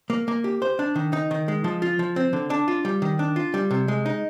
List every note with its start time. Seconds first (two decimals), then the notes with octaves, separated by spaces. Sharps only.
0.10 A#3
0.28 A#3
0.44 G4
0.62 C5
0.79 D4
0.96 D#3
1.13 D#4
1.31 D#3
1.48 G#3
1.64 F3
1.82 F4
1.99 F3
2.16 C4
2.33 D3
2.50 D4
2.68 F4
2.85 G3
3.02 D#3
3.19 D4
3.36 F4
3.54 G3
3.71 C3
3.88 G#3
4.06 D#4